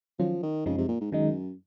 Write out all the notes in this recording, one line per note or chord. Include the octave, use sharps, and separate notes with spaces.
D#3 F3 F#3 C#4 F4
D#3
F#2 C#3 F3 G#3 C4 D#4
C3
A#2
G#2
F#2 D#3 G#3 D#4